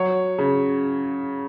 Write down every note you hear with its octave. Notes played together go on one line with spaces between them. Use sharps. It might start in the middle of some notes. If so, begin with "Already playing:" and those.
Already playing: F#3 C#5
C#3